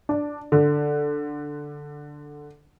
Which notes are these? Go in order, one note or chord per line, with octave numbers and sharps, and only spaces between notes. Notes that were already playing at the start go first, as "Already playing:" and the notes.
D4
D3